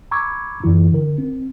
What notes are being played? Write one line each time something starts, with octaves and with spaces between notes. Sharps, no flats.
A#5 B5 C#6 D6 E6 G#6
F#2 E3 E4
D3 A#4
C4